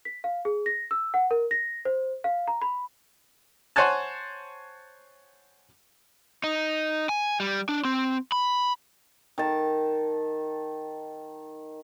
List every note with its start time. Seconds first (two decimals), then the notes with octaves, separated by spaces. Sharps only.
0.05 B6
0.24 F5
0.45 G#4
0.66 A#6
0.91 E6
1.14 F#5
1.31 A#4
1.51 A#6
1.85 C5
2.24 F5
2.48 A#5
2.62 B5
3.76 C5 C#5 F#5 G#5 A5
6.44 D#4
7.09 G#5
7.40 G3
7.69 D4
7.85 C4
8.32 B5
9.38 D#3 A5